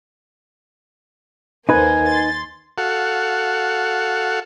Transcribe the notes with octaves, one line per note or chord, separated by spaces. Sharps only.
D#2 A#3 D#4 B4 C5 G#5
C6 A6
F#4 A4 F5 F#5